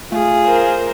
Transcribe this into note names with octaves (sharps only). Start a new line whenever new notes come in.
A3 F4 G#4
A#4 C5